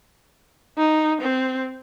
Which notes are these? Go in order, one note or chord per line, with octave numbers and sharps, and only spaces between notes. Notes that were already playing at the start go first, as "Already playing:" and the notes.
D#4
C4